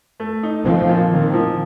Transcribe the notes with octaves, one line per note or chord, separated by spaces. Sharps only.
A3
D#4
F3 C4
A#2
D#3 C4
F3